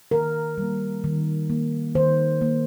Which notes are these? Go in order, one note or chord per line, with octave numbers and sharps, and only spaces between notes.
D#3 A#4
G3 A#3
D#3
A#3
D#3 C5
A#3